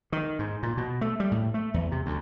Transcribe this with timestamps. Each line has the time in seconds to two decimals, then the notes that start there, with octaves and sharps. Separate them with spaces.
0.12 D#3
0.39 G#2
0.63 A#2
0.77 B2
1.01 A3
1.20 G3
1.32 A2
1.54 A3
1.74 E2
1.92 C3
2.06 D2